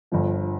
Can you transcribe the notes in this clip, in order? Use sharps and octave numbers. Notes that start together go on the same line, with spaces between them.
G1 G2 F3